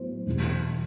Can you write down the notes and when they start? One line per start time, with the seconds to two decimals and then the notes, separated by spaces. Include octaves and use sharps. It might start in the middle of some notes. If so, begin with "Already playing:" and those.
Already playing: A2 F#3 B3 E4 C5
0.26 E2 B2 G3 B3